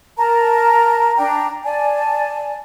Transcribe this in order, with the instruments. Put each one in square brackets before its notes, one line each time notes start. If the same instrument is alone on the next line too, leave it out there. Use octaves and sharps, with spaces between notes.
[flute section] A#4 A5 A#5
D4 G5 A#5
D5 G#5 A5